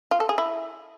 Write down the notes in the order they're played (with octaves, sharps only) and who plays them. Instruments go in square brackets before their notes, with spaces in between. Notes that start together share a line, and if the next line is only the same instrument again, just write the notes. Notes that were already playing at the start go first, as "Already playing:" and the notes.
[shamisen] F4
A4
G#4
E4